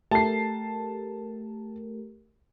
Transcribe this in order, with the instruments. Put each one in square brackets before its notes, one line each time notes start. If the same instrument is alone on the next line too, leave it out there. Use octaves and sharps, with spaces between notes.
[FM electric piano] A3 G4 A#4 [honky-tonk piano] A5 C7